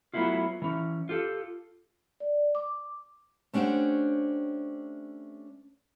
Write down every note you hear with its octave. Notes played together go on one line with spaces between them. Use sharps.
F#3 A3 B3 E4 F4
E3 C#4
F4 G4 A4
D5
D6
A3 C#4 D4 G4 C5 F#5